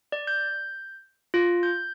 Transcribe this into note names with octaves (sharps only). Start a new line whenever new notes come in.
D5
G6
F4
G6